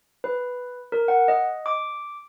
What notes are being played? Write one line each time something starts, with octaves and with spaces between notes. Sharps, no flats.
B4
A#4
F#5
D#5
D6